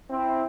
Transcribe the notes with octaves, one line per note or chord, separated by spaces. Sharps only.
C4 E4